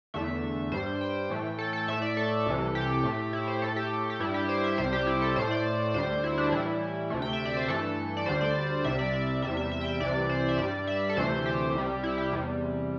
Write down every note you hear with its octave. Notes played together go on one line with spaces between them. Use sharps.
E2 D3 A3 E5
G2 G3 C5
G5
A2 E3 A3
A4
A4
A2 A3 E5
D5
A4
C2 C3 E3
G4
A2 A3
E4
C5
A2 A3 A4
G4
G4
G2 G3 E4
G4
C5
E5
C2 C3 G3 C5
G4
E4
A4
A2 A3 C5
D5
D2 D3 G3 C5
E4
D4
A2 E3 G3 E4
D2 C3 A3
G5
E5
D5
C5
G2 E3 A3 A4
D5
D2 D3 G3 C5
D5
C2 C3 G3 E5
D5
D5
E2 C3 G3 E5
E5
E5
G5
E5
C2 C3 E3 D5
C5
E5
G2 G3 D5
E5
A4
D2 C3 E3 A3 C5
G4
C2 C3 G3
E4
G4
E2 C3 G3